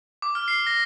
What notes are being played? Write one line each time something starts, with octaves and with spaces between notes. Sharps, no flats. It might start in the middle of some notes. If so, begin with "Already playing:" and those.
D6
F6
C7
A#6